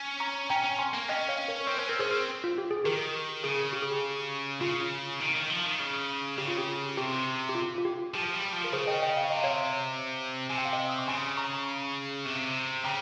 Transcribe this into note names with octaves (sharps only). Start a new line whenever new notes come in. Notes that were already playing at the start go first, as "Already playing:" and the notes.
Already playing: C#4
A#5 C#6
C#4 G5 A#5
C#4
G#5 C6
A#3
C#4 D#5 G5
C#5 F5
A#4 C#5
C4 C#5
C#4 C5
C4 A#4
C#4 G#4 C5
C4
F4
G4
G#4
D#3 G4 A#4
C#3 G#4
G4
G#4
G4
C#3 F4
D#3
D#3
F3
D#3
C#3
C#3 G4
F4
G4
C3 G4
G4
F4
F4
G4
F3 G4
G3
F3
A#4
C#3 G#4 C5
D#5 G5
D#5 G5
F5
C3 D#5
C#5 F5
C3 G#5
G5
F5
D#5 G5
D#6
C#6
C#3 G#5 C6
A#5 C#6
C3
C#3 G5 A#5